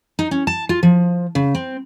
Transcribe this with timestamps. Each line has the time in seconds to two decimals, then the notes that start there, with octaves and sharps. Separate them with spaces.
0.19 D#4
0.31 C#4
0.47 A5
0.69 F4
0.83 F3
1.35 C#3
1.55 C4